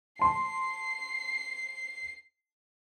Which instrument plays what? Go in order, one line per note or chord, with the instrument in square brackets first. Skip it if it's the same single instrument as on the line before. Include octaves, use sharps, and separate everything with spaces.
[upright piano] A5 C6 [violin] C7